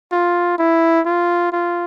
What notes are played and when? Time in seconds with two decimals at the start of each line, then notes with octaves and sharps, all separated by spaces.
0.12 F4
0.58 E4
1.06 F4
1.52 F4